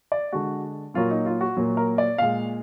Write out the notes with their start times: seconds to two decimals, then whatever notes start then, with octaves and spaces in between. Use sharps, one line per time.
0.12 D5
0.32 D3 G#3 F#4
0.94 A#2 F#3 A#3 F4
1.11 D#4
1.26 F4
1.41 F#4
1.57 A#2 F#3 A#3
1.77 A#4
1.98 D5
2.18 A#2 G#3 F5